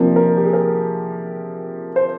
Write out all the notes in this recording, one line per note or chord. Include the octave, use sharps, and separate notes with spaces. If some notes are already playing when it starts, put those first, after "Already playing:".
Already playing: C3 F3 A#3 D4 A#4
A#4
G4
G#4
A#4
C5